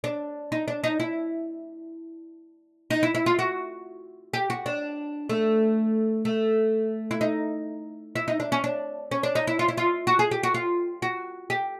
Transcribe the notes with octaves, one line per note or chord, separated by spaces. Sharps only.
D4
D#4
D4
D#4
E4
D#4
E4
E4
F4
F#4
G4
F#4
D4
A3
A3
E4
D#4
E4
D#4
D4
C#4
D4
C#4
D4
D#4
E4
F4
E4
F4
F#4
G#4
G4
F#4
F4
F#4
G4